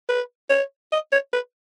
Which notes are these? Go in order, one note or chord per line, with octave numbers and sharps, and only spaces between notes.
B4
C#5
D#5
C#5
B4